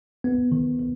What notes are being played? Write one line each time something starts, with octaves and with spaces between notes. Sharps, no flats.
B3
D#3
D#3